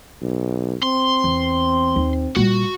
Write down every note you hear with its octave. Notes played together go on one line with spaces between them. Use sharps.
B1
C4 C6
E2
D#2
A#2 G3 F#4